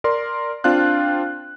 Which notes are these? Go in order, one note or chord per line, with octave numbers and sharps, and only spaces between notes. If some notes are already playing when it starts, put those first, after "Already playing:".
A#4 D5 C6
C4 D4 F4 F5 F#6